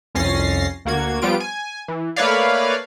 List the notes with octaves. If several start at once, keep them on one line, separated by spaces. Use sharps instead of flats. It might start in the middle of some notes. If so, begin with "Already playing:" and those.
C2 F2 C#4 A6 A#6 C7
D2 A#3 F#4 G#6
F3 G3 B3 F4 D7
G#5
E3
A3 A#3 B4 C#5 D5 F5